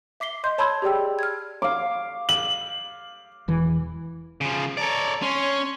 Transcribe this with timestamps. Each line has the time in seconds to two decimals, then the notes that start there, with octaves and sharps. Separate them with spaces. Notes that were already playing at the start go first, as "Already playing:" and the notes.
0.20 E5 D6 B6 C7 G7
0.44 D#5 C6 G6
0.58 C#5 A5 B5 C6 E6 G#6
0.82 G4 G#4 D5 G5 E6
1.19 F6 G#6
1.62 F5 D6
2.29 F#7
3.48 E1 E3
4.41 C#3 F3
4.77 A4 C#5 D5 A#5
5.22 C#4 C#5 C6